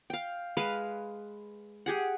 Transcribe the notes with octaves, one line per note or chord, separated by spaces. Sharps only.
F5 G5
G#3 B4 F5
G4 G#4 F#5